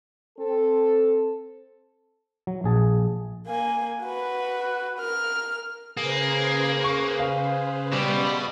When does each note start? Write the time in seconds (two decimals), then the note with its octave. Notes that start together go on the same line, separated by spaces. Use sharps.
0.39 C4 A4
2.47 F#3
2.64 A#1 G#4 A5
3.47 A#3 G#5
4.02 F#4 B4
4.99 A#4 F6
5.97 C#3 A#3 G#4 B4 C5
6.84 C#6
7.19 F5
7.93 B2 G4 D5